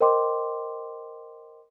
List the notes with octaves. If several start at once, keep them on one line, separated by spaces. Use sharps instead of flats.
A#4 C5 D#5 G5 C6 D6